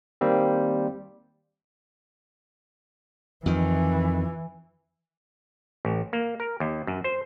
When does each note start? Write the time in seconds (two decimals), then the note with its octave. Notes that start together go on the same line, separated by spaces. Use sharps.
0.21 D#3 G3 A#3 C4
3.46 F2 D#3 E3
5.85 A1
6.13 A#3
6.40 A#4
6.60 D#2
6.87 F#2
7.04 C5